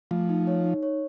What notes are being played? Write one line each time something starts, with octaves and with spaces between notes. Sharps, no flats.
F3 A3
D#4
C#5
D#4
C#5